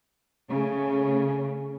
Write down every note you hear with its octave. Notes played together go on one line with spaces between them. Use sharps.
C#3 A3